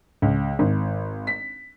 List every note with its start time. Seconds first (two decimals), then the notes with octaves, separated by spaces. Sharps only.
0.22 C#2
0.59 G#1
1.27 B6